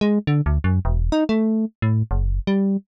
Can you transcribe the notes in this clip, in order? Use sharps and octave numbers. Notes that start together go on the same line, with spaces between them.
G#3
D3
D2
F#2
E1
D#4
A3
A2
F#1
G3